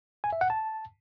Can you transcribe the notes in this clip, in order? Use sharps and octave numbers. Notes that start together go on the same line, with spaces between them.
G#5
E5
F#5
A5